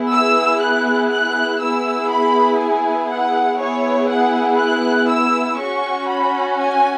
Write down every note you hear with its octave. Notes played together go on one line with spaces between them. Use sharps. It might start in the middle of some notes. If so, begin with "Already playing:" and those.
Already playing: B3 E4 G#4
E6
F#6
F#6
B3 E4 G#4 E6
B5
G#5
F#5
B3 E4 G#4 C#5
F#5
F#6
E6
C#4 F#4 C#6
B5
G#5